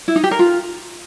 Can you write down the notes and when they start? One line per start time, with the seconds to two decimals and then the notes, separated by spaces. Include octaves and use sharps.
0.08 E4
0.16 D#4
0.23 G4
0.31 A#4
0.39 F4